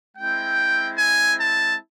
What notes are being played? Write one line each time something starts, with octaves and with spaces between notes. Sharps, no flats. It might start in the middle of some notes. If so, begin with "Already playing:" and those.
G#3 C4 E4 G5
G#5
A5